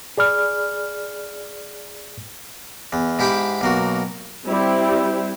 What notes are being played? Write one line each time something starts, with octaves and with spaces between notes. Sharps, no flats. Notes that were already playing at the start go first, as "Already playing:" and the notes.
G#4 D5 B5 F6
E2
G#2 E4 G4 F5 G5 B5
B1 A#3 F#4
G3 C4 E4 G4